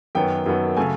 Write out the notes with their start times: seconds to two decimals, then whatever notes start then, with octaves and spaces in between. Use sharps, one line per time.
0.15 F#2 D#3 F#3 B3 G5
0.46 F#2 D#3 F#3 B3
0.77 C#3 F#3 A3 G#5